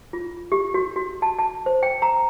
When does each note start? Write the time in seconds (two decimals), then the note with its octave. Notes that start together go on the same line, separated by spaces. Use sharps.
0.13 F4
0.52 G4
0.74 F#4
0.96 F#4
1.22 A5
1.39 A5
1.66 C5
1.83 G5
2.02 A#5